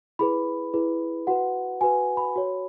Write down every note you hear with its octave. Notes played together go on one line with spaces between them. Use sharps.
E4 G#4 B4 B5
E4 G#4 B4
F#4 B4 F#5
F#4 B4 G#5
B5
F#4 C#5